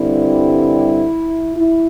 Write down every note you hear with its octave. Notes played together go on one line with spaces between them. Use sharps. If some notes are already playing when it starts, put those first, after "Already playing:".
Already playing: G2 D3 G3 C4 E4
E4